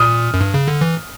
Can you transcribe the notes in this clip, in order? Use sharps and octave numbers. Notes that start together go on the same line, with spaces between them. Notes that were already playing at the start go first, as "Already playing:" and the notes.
Already playing: A#2 D#6 F6
F#2
G2
C#3
D3
E3